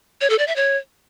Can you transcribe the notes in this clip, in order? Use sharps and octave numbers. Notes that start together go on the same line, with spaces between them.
C#5
A4
D5
E5
C#5